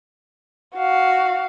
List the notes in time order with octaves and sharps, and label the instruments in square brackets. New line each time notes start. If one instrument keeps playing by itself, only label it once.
[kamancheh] F#4 F5